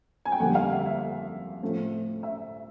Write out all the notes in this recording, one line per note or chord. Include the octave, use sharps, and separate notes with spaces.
G#5
G5
F2 D3 G3 A#3 F#5
F5
E5
E5
A2 F3 A3 C4
E5